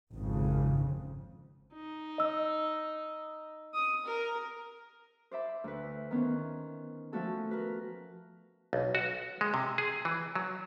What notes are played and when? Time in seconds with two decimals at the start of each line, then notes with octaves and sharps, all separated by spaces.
0.14 G#1 F2 C#3
1.73 D#4
2.18 D#5 E6
3.74 D#6
4.06 A#4
5.31 C5 D5 E5 B5
5.64 D2 B4
6.11 D#3 B3 C#4 C5
7.12 F3 A3 F#4 A4 G#5
7.51 A#4 B4
8.73 B1
8.95 F#4
9.41 G#3
9.54 C3
9.78 G#4
10.05 E3
10.35 F#3